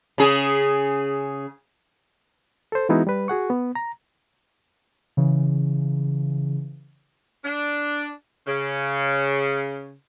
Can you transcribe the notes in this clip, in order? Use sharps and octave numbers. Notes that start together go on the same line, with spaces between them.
C#3 G#4
A4 C5
E3 G#3 B3 D#4 E4 F#4
G3 B4
F#4 G#4 F#5 C#6
B3
A#5
C#3 E3
D4
C#3